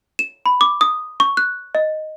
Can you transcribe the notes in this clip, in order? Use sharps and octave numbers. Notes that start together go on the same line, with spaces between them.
E7
B5
D6
D#6
C#6
F#6
D#5